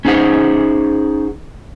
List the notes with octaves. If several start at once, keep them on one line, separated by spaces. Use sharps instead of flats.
C#4 D#4 G#4 C5 F#5